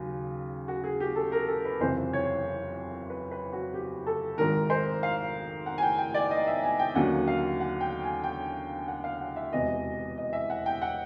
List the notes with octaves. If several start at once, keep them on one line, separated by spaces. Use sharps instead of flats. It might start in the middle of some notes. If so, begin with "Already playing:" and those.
Already playing: D#2 C#3 F#3
F#4
G#4
G4
A4
A#4
A4
B4
F#1 F2 C3 E3 C5
C#5
B4
B4
F#4
G4
A4
G#1 G#2 D#3 A#4
C5
F5
F#5
G#5
G5
G5
D5
D#5
E5
G#5
G5
D#2 D3 F#3 A#3 C#4 F#5
F5
F#5
G5
G#5
G5
F#5
F5
F#5
E5
E1 E2 C3 E3 D#5
D#5
E5
F#5
G5
F#5